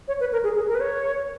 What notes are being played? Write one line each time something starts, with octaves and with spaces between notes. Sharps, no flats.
C#5
B4
A#4
G#4
G#4
A#4
B4
C#5